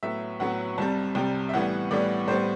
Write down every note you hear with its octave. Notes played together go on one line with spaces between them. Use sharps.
A2 F#3 B3 E5
A2 F#3 B3 F#5
C2 C3 G3 A5
C2 C3 G3 G5
E5
A2 E3 G3 B3 F#5
A2 E3 G3 B3 D5
A2 G3 B3 C5